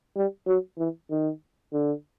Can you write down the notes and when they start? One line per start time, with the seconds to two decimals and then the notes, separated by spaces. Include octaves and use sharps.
0.16 G3
0.47 F#3
0.78 E3
1.10 D#3
1.73 D3